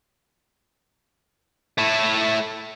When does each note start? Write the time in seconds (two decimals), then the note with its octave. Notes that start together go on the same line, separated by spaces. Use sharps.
1.78 A3 E4